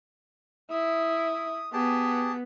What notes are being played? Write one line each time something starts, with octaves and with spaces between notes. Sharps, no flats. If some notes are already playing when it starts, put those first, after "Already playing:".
E4 D#6
B3 G4 G#4 A5